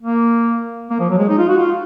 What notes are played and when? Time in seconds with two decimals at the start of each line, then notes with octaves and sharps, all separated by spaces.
0.02 A#3
0.90 A#3
1.00 F3
1.10 F#3
1.19 G#3
1.29 D#4
1.39 F4
1.49 F#4
1.58 F4